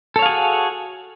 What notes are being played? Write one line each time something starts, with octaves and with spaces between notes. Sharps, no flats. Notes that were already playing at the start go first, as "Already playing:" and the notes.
F#4 G#4 A4 C#5 F5